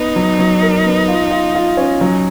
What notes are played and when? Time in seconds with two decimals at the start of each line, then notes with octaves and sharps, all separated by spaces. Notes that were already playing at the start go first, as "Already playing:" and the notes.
Already playing: B3 D#4
0.16 F#3
0.39 F#3
0.62 A#4
0.86 B3
1.08 F4
1.31 F4
1.55 F4
1.77 C#4
2.01 F#3